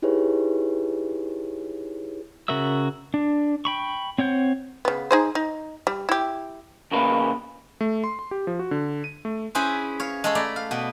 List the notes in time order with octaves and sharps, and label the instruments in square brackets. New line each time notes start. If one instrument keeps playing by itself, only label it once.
[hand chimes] D#4 E4 G4 G#4 B4 C#5
[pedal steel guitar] C#3 F#4 A#4 E5 E6
D4
G5 B5 C#6
C4 C#5 F#5 G6
[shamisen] C#3 B3
D#4 G#4 C5
D#4
G3
E4 G4
[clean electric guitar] E2 C#3 A#3 B4
[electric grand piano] A3
C6
C6
G4
F3
F#4
D3
D#7
A3
[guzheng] C#4 E4 G#4 B4 C5
C#5 F5
G#3 A4 C#5
A3 D5 A#5 B5
F5
B2 B3